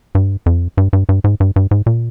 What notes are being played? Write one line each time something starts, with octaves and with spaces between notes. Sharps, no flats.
G2
F2
G2
G2
G2
G#2
G2
G2
G#2
A#2